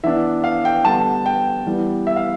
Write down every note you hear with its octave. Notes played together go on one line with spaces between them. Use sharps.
E3 B3 D4 E5
F5
G5
D3 G3 B3 A5
G5
E3 G3 B3
E5
F5